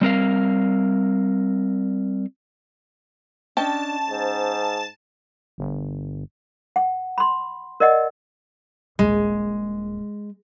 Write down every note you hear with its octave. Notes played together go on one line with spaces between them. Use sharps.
G3 C4 A#4 F5
C#4 D4 D#5 G5 A5
G#2 C5
G1
F#5
B5 C6
A#4 D5 D#5 F#5
D#1 A#1 G#3